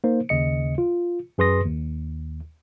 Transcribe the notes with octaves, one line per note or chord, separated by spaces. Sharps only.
A#3 D#4 C5
D#2 C#3 D#5 C#7
F4
F#2 G#4 B4 C6 D#6 A#6
D#2